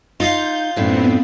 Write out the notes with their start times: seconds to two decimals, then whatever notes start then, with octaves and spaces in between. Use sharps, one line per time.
0.20 D#4 F4 D#5 F5 G6
0.76 F#2 A2 B3 C4 D4